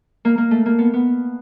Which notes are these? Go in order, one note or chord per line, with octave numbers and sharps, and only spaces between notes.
A#3
A#3
A3
A#3
B3
B3